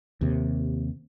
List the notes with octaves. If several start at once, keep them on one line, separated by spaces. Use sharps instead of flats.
D#2 C3